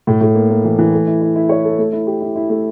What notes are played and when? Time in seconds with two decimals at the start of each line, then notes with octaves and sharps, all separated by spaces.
0.07 A2
0.21 A2
0.35 A#3
0.50 A#3
0.65 E3
0.78 E3
0.93 A3
1.07 E4
1.22 E4
1.36 E4
1.49 C#5
1.64 A4
1.78 A3
1.93 E4
2.07 G4
2.21 E4
2.36 E4
2.50 A3